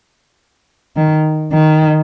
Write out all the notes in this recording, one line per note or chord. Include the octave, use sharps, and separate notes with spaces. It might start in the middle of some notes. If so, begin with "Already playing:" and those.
D#3
D#3